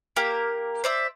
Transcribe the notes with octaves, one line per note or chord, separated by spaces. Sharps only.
A#3 G4 A#4
C5 D5 E5